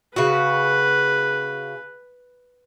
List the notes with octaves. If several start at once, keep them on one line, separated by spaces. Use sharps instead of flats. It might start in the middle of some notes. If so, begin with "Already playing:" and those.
C#3 F#4 B4